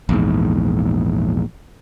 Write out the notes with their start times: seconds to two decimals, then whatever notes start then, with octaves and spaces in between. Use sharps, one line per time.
0.09 A#1 E2 G#2